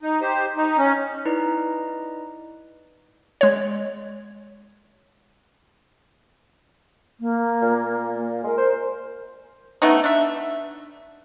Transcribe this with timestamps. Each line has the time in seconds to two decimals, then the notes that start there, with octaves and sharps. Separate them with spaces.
0.03 D#4
0.22 G4 C5
0.56 D#4
0.78 C#4
1.25 D#4 E4 B4 D5 D#5 A#5
3.41 G#3 C#5
7.20 A#3
7.62 A#2
8.44 G#3 A#4
8.58 C5
9.82 A3 B3 C#4 D#4
10.04 D4 E5